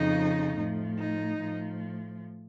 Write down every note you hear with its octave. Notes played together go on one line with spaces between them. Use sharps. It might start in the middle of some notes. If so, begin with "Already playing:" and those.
Already playing: F2 C#3 F3 D#4
A2 F3
D#4
A2 F3